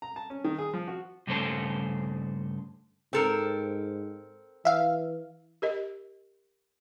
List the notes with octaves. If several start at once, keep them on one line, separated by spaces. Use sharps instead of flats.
A#5
A5
C#4
D#3
G#4
F3
F#4
G2 C#3 A3 C5 C#5 A5
G#2 C4 A4 A#4
E3 E5 F5
G4 A#4 D#5